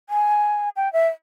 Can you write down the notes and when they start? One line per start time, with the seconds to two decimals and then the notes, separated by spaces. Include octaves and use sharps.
0.09 G#5
0.76 G5
0.93 E5